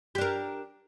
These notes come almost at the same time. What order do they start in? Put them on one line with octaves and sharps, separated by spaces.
G4 D4 A#4